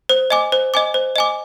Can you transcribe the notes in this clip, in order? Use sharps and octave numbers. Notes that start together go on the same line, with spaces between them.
C5
D#5 G#5 D6
C5
D#5 G#5 D6
C5
D#5 G#5 D6